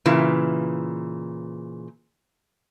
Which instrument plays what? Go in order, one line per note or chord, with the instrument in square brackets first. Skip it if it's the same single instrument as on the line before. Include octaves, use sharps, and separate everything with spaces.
[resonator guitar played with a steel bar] A#2 C#3 E3